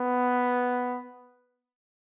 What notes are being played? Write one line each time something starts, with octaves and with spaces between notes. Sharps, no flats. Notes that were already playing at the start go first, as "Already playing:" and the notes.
Already playing: B3